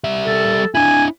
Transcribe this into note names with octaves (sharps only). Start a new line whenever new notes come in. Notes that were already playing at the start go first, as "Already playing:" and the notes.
G3 E5
A4
D4 E4 G#5